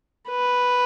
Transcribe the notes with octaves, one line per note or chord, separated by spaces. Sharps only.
B4